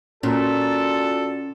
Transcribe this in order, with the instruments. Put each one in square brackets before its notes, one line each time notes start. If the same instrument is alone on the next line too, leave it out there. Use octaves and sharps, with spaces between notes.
[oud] A#2 [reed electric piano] C#4 [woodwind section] F#4 D5 [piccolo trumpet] A4